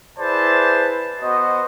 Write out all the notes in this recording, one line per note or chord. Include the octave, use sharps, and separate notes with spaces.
E4 G#4 B4 C5 D5 A5
B3 F#4 C5 D#5